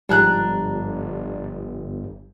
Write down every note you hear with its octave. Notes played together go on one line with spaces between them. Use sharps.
G1 G#2 F3 G3 D4 A#5 F#6